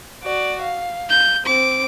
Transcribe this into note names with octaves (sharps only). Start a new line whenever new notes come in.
F#4 D5
F5
G6
C4 D6